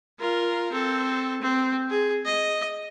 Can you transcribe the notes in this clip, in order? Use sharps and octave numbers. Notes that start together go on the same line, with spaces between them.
F4 A#4
C4 A4
C4
G#4
D#5